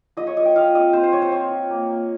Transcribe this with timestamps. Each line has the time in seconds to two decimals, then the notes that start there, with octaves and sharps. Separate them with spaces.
0.17 F3 D#5
0.27 C#5
0.37 F4 D#5
0.45 G5
0.56 F3 F5
0.75 C4 D#5
0.93 C4 C5
1.03 C5
1.13 F3 C#5
1.22 C5
1.32 C4 C#5
1.51 F3
1.70 A#3
1.89 A#3